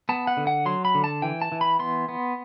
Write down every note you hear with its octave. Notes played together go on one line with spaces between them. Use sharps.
B3 A5
F#5
D3
F#5
F#3 C6
B5
D3
A5
E3 G5
A5
E3
B5
B3 C6
B3